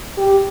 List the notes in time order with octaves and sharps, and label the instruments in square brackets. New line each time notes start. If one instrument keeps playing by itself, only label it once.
[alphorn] G4